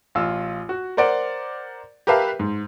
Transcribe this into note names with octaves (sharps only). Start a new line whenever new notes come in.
A1 F4 E6
F#4
A#4 C5 D5 F#5 D7
G4 A#4 B4 E5 F5 A5
G#2